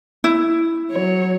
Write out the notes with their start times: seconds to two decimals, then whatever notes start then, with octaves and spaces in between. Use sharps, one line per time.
0.24 E4
0.92 F#3 C#5